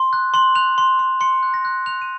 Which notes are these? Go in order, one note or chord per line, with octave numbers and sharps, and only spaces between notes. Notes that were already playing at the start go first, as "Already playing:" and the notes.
Already playing: C6
F#6
C6 F#7
F#6 F7
C6
C6
C6 C#7
F#6
A#6
F#6
F#6 F7
D#7